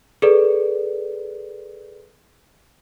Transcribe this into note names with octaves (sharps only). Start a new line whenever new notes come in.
G#4 A4 B4 D5